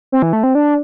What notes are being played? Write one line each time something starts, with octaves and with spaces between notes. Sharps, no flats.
C4
E3
A3
C4
D4